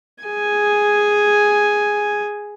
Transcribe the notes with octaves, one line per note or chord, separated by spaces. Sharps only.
G#4 G#5